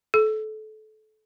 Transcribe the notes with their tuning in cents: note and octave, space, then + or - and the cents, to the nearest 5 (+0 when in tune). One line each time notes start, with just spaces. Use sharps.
A4 -25